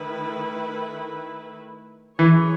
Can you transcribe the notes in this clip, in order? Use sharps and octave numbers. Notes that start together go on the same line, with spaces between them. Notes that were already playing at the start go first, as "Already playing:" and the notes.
Already playing: D#3 A3 E4 B4
E3 F#3 C#4 G#4 C#5